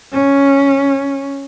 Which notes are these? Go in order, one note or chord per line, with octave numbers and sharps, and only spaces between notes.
C#4